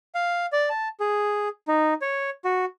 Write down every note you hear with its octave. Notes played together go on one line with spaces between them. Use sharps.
F5
D5
A5
G#4
D#4
C#5
F#4